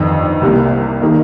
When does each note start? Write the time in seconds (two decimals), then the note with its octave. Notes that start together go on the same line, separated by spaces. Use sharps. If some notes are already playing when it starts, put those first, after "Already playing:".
Already playing: G1 F2 D#3
0.41 C2 C3 G3 A#3
1.01 D#3 A#3